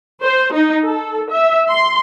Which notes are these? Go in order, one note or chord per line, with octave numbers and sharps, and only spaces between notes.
C5
D#4
A4
E5
C6